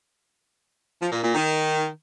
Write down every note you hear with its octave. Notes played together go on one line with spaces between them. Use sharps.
F3
A#2
A#2
D#3